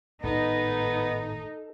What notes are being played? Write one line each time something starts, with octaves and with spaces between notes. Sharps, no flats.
G#1 A2 A3 B3 D#4 A4